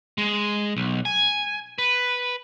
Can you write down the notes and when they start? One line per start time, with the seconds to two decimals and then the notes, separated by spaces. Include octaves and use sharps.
0.18 G#3
0.77 B1
1.05 G#5
1.78 B4